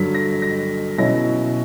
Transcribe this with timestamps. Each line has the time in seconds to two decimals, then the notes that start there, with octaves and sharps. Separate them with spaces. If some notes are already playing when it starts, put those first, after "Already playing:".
Already playing: G2 D3 F#3 B6
0.15 A#6
0.42 A#6
0.98 B2 F#3 C#4 E4 A#6